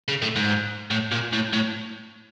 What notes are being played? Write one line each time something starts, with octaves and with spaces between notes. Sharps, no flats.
C#3
A2
G#2
A2
A#2
A2
A2